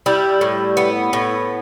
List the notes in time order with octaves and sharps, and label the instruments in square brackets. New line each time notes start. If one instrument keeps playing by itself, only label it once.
[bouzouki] G3 E4
A2
B3
A2